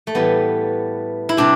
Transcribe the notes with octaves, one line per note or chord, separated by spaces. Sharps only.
A3
A2 E3 G3 B3
E4
C3 G3 D4